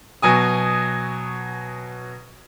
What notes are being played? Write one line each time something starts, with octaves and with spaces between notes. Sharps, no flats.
B2 F#3 G#5 D#6